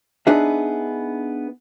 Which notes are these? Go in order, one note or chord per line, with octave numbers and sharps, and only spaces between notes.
B3 D4 D#4 G#4 B4 E5